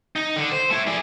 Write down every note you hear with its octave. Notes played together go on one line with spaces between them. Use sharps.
D#4
D3
C5
A3 E4
G#4 D5